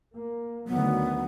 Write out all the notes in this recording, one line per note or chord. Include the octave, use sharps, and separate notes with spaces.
A#3
D2 D#3 F#3 B3